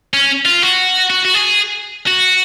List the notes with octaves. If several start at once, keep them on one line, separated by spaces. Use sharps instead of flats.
C#4
F4
F#4
F#4
F#4
G#4
F#4